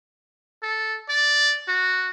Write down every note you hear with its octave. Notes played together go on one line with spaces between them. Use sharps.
A4
D5
F#4